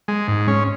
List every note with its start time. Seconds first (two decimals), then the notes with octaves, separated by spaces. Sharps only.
0.08 G#3
0.28 G#2
0.48 C#4